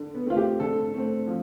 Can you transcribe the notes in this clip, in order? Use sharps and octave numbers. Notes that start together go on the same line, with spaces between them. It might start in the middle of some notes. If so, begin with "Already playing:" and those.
Already playing: D3
B3
A3 C4 F4
G4
D3 A4
A3 C4
F3